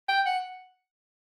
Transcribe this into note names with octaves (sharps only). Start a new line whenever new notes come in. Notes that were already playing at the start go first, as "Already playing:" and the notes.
G5
F#5